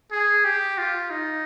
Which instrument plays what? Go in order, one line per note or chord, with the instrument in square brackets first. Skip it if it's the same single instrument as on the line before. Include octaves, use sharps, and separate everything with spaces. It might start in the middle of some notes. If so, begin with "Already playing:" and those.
[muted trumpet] G#4
G4
F4
D#4